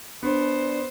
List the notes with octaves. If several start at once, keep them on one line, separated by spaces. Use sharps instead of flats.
B3 D4 C5